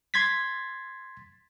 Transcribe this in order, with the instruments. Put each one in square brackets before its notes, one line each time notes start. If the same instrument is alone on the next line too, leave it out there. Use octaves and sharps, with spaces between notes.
[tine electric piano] C6 G#6 A6 B6